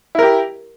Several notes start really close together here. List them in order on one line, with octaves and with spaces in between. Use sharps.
E4 A#4 G4